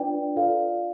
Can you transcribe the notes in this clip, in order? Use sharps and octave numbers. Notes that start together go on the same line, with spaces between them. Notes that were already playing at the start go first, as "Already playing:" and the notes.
Already playing: D4 F4 B4 D5 G5
F4 A4 D5 F5